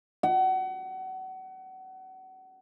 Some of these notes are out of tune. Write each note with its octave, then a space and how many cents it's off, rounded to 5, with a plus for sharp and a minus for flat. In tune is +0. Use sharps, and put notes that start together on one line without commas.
F#5 +30